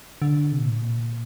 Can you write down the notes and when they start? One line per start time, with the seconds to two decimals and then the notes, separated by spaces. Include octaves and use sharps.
0.22 D3
0.52 C3
0.60 A#2
0.69 A2
0.76 A#2